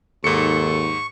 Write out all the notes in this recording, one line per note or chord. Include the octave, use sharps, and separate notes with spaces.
D#2 G#2 A4 C#6 C#7